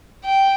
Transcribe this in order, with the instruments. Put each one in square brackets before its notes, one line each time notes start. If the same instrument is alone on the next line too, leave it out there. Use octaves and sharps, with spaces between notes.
[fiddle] G5